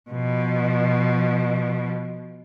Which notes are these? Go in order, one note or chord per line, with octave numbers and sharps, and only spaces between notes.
B2 F3